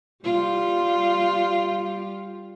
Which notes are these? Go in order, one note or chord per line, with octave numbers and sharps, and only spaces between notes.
G3 F4